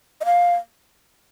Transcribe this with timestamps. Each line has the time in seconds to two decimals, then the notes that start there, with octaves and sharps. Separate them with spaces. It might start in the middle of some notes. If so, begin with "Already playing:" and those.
0.21 D#5
0.25 F5